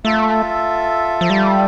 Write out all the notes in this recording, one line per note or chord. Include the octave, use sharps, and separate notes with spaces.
A3 F4 A4 E5
F3
G3